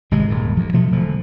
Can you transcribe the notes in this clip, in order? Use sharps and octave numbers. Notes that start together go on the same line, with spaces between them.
G#1 C3 G#3
D#1 G#2 D#3
D2 F3
B2 F3 F#3 A3
E1 D3 F3